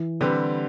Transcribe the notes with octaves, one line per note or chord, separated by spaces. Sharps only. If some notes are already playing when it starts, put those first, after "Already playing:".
Already playing: E3
D3 G3 C4 G4 B4